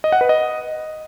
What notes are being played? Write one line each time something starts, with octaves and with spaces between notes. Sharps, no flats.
D#5
F#5
B4
D#5